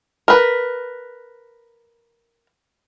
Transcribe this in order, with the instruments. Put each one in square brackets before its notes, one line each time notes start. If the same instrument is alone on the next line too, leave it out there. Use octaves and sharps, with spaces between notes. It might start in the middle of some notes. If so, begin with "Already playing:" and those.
[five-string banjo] A#4 B4